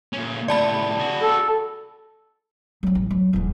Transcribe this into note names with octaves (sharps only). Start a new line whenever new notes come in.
A#2 C#4
A2 C3 D5 A5 B5
F#4 G#4
A4
F#3 C4
A1
F#3
D#1 E2